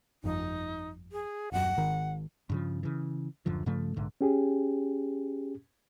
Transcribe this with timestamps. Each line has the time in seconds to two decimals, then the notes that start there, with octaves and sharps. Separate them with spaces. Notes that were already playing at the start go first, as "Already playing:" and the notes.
0.24 G1 F2 D#4
1.12 G#4
1.52 D#1 F#2 F#5
1.77 G#1 D#3
2.49 G2 C#3 F3
2.83 C#3 E3
3.46 D1 F#2 D3 F3
3.66 G2 C#3 F3 A3
3.96 A#1 G#2 D3
4.21 C#4 G4 G#4